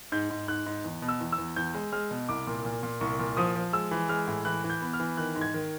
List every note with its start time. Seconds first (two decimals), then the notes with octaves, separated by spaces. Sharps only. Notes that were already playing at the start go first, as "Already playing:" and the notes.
0.12 G#2 G6
0.30 G#2
0.48 G#2 F#6
0.66 G#2
0.84 E2
1.02 B2
1.08 E6
1.20 E2
1.32 E6
1.38 E2
1.56 E2 G6
1.74 G#3
1.92 G#3 F6
2.11 B2
2.29 C2 D6
2.47 A#2
2.65 A#2
2.83 A#2
3.01 C2 C#6
3.19 A#2
3.37 F3 D#6
3.55 F3
3.73 G#3 E6
3.91 E3
4.09 G#3 F6
4.27 A2
4.45 E3 F#6
4.64 E3
4.70 G6
4.82 B3
4.93 F6
5.00 E3
5.17 D#3 F#6
5.36 G#2
5.41 G#6
5.54 D#3